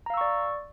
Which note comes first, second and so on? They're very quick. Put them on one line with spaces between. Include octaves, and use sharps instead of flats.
A#5 F5 E6 C#6 D5